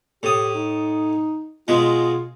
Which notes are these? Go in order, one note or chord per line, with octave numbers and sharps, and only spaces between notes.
A2 G4 D#6
D#4
B2 G#3 F4